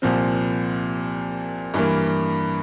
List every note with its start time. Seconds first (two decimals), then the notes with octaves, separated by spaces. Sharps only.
0.02 C2 A#2 F3 C4
1.74 G2 E3 A#3